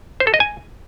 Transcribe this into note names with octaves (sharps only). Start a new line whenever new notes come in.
C5
A4
D#5
G#5